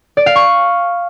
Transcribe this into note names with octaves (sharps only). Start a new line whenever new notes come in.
D5
F5
C#6